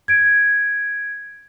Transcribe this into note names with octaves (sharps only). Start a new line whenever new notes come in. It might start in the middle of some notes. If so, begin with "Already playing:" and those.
G#6 D7